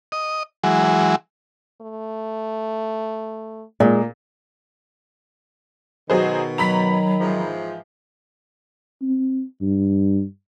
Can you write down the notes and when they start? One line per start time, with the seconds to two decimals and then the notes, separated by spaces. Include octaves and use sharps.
0.12 D#5
0.64 E3 F#3 G#3
1.81 A3
3.80 A#2 G#3 A#3
6.10 B2 D#3 F#3 G#4 C5
6.58 F#3 A#5 B5 B6
7.19 G#2 E3 F3
9.02 C4
9.61 G2